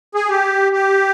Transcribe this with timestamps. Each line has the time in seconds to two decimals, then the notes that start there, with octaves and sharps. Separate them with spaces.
0.15 G#4
0.29 G4
0.73 G4